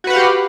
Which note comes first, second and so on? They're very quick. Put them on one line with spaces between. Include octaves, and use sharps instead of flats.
F#4 B4 F#5 F5 G4